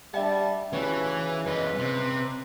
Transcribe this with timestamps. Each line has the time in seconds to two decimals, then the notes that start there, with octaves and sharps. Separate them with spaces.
0.14 G3 D4 E5 F#5 A5
0.73 C#3 E3 C#4 D#4 F#4 B4
1.46 F#2 B4 D#5
1.79 C3 C5